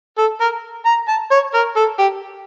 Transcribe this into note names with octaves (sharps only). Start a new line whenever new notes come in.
A4
A#4
A#5
A5
C#5
A#4
A4
G4